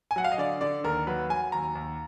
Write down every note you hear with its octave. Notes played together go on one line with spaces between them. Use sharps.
G#5
F#3 F#5
F5
D#5
D3 D5
D3 D5
D#2 A#4
F#3 B4
F#3 G#5
D#2 A#5
D#2